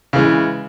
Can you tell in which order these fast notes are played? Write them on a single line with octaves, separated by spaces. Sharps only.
C#3 E3 G#3